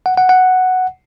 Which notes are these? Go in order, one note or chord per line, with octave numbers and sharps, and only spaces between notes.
F#5
F#5
F#5